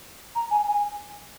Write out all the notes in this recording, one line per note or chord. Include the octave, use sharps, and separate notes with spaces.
A#5
G#5
G#5